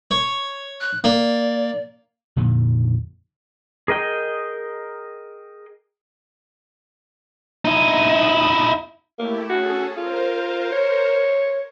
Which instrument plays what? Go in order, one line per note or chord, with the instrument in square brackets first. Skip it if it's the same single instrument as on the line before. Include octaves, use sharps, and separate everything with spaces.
[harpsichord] C#5
[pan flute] F#6
[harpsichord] A#3 [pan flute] D5
[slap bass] F2 A#2 D3 D#3
[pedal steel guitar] G#4 A#4 D#5 G5
[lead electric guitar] D#4 E4
[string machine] A3 E4 G4 [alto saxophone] A#3
[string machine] C#4 G#4 A4 [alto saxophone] F#4
[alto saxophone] F4 [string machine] A#4 C5
[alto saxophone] C#5